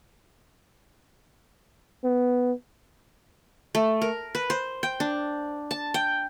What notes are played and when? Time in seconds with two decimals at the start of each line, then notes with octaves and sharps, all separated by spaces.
2.04 B3
3.75 A3
4.02 A#4
4.35 B4
4.50 C5
4.83 G5
5.00 D4
5.71 A5
5.94 G5